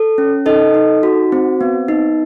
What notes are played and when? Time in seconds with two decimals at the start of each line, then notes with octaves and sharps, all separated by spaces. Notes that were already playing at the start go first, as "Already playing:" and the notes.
Already playing: A4
0.18 C#4
0.46 D#4 A4 D#5
0.74 D#4
1.03 F#4
1.32 C4
1.61 B3
1.88 D#4